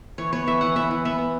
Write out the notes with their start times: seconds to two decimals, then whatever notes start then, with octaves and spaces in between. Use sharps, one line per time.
0.18 E3 C#5
0.33 B3 C#5
0.47 E3 E5
0.61 E3 F#5
0.76 B3 E5
0.91 E3
1.05 B3 E5
1.18 B3